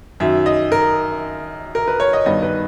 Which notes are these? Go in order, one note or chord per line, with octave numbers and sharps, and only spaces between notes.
F#2 D#3 F#3 E5
D#5
A#4
A#4
B4
C#5
D#5
G2 D#3 G3 B3 D#5
B4